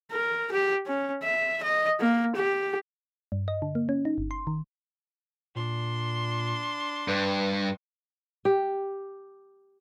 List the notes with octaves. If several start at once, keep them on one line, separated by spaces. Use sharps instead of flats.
A#4
G4
C#4
E5
D#5
A#3
G4
G2
D#5
D3
A#3
C#4
D#4
G1
C6
D#3
A#2 D4 C6
G2 B4
G4